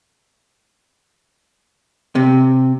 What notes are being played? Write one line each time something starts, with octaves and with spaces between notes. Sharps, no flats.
C3